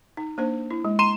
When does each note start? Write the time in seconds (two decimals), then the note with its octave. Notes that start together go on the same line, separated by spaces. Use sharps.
0.17 D#4
0.38 A#3 D4 C5
0.71 E4
0.85 G#3
0.99 A#5 C6 D#7 E7